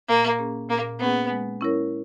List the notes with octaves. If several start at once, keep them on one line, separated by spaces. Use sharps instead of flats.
A#2 A#3
A#3 C#4 G#4
A#2 A#3
A#3 B3 C#4 G#4
G#3
C#4 E4 A#4 C#5